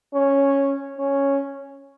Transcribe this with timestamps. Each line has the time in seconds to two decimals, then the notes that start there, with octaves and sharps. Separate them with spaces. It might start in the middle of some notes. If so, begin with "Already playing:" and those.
0.14 C#4
0.98 C#4